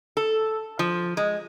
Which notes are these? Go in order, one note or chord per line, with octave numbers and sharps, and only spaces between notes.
A4
F3
G#3